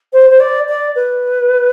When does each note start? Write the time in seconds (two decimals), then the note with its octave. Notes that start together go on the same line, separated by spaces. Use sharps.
0.13 C5
0.30 C5
0.40 D5
0.69 D5
0.95 B4